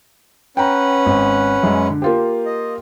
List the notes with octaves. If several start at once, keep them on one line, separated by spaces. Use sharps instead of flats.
C#4 B4 F#5 G5 A#5
G#1
F#2 G#3
D3
A#3 F4 G4
D#5